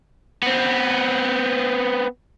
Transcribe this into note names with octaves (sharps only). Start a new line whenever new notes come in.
B3 C4